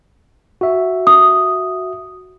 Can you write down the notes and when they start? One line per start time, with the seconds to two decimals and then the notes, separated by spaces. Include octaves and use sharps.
0.61 F#4 E5
1.07 D#6